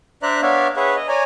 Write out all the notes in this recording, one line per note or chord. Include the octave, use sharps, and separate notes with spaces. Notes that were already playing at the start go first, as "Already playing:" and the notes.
D4 C5 D5 E5 A#5 F#6
B3 D4 C#5 D5 E5 F5
G#4 B4 C#5 E5 F#5
D#5
C#5 D5 G#5 A#5